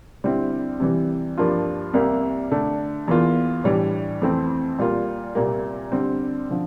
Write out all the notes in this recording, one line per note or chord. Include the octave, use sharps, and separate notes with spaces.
D3 G3 C4 E4
C3 E3 G3
G2 F3 A#3 D4 F4
C2 C3 G3 A#3
D3 A3 D4
E2 E3 A#3 F4
A2 E3 G3 D4
F2 E3 A3 C4
A#2 G3 A#3 F4
C2 A#2 G3 A#3
D3 G3 C4
D3 F3